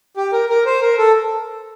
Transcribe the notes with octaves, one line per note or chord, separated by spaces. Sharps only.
G4
A#4
A#4
C5
A#4
A4